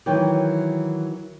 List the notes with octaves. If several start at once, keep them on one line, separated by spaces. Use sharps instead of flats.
D#3 E3 F#3 G5